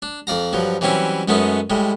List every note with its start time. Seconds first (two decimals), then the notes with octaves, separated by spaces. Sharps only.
0.02 D4
0.27 F2 D5 F5 A#5
0.53 G2 F3 F#3
0.81 E3 F#3 G3 C4 C#4 E4
1.28 F#2 G#3 A3 B3 C#4 D#4
1.70 A2 G3 G#3